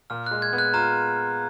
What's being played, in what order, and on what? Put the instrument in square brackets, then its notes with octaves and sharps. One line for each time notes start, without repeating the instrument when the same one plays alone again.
[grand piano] A#2 [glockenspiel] F6
[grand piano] G#3 [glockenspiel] F#6
[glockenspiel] G#6
[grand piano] B3
[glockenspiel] F#6
[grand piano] F4 [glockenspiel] A#5